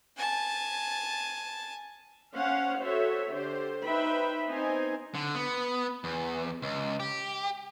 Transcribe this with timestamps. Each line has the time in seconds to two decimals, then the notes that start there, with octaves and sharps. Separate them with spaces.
0.17 G#5 A5
2.35 C#4 C5 F5 F#5
2.79 F#4 A4 C5 C#5 E5
3.32 D3 G4 C5
3.84 D#4 B4 C5 E5 G5 B5
4.50 B3 C4 D#4 C5 D#5 G#5
5.15 D3
5.35 B3
6.04 E2
6.62 C#2
7.00 G4